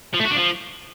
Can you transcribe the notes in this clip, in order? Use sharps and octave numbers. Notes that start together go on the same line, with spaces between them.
F3
A3
F#4
D4
F3